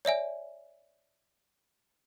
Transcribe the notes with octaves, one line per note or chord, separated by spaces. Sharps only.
C#5 D5 E5 G#5